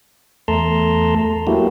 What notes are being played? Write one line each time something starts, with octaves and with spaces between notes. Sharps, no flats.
E2 A3 A4 A5 A#5 C6
F#3 A3 A#3 E4 F#4 G4